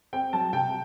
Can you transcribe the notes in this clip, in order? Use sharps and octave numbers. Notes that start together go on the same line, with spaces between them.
C4 G5
F#3 A5
C3 G5